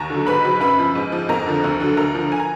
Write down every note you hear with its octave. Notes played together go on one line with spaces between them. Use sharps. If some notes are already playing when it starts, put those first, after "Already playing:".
Already playing: D#2 A#5
D3 F#3
G#2 B4 B5
F#3
F#2 B4 B5
F3
G#2
F3
F2 A#4 A#5
D3 F3
D2
D3 F#3
D2 A#4 A#5
D3 F3
G#5
A#5